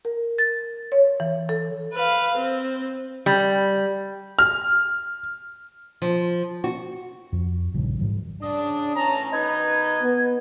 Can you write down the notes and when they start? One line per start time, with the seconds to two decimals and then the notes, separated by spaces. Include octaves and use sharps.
0.05 A#4
0.38 A6
0.92 C#5
1.20 E3
1.49 A4
1.93 B4 F5
2.37 C4
3.26 G3
4.39 F6
6.02 F3
6.64 F#4
7.32 F2
7.74 D#1 A#1 G2 C#3
7.98 G#2 E3 G3
8.42 C#3 D4 D#6
8.96 A2 E3 C#4 A5 A#5
9.32 B2 D#3 D#4 B4 D#5 G#6
10.03 B3